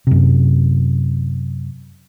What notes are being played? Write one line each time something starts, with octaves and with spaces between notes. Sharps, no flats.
F#2 C3